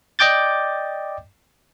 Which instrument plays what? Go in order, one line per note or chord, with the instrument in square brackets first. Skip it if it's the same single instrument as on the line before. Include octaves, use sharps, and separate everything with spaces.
[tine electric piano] D5 D#5 G5 D6 G6 A6